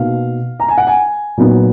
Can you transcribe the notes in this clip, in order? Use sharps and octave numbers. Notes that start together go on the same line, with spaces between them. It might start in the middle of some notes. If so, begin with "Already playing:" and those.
Already playing: B2 A#3 D#4 F5
A#5
G#5
F#5
G#5
A#2 F#3 B3 D#4